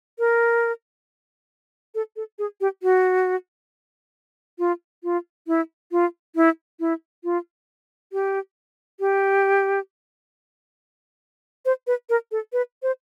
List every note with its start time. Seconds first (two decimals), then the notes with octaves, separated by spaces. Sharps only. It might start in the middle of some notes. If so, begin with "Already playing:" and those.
0.19 A#4
1.95 A4
2.16 A4
2.39 G#4
2.61 G4
2.83 F#4
4.59 F4
5.04 F4
5.47 E4
5.92 F4
6.36 E4
6.80 E4
7.24 F4
8.13 G4
9.00 G4
11.65 C5
11.87 B4
12.09 A#4
12.32 A4
12.53 B4
12.83 C5